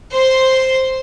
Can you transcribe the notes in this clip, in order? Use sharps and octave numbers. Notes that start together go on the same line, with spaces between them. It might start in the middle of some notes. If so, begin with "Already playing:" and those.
C5 C6